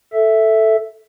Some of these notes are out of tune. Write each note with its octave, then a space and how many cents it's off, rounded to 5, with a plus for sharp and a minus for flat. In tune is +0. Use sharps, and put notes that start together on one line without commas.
A4 +0 E5 +0